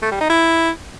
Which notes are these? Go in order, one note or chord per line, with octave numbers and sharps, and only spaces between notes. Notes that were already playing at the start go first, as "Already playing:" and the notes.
A3
G3
D#4
E4